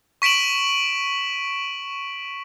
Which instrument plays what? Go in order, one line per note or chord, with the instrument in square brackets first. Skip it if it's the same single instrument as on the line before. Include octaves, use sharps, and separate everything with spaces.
[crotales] C#6 B6 D7 E7 F#7